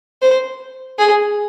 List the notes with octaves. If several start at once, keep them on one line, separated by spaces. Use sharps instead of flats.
C5
G#4